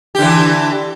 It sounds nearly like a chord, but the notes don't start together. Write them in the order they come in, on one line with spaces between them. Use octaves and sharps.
G4 D3 E3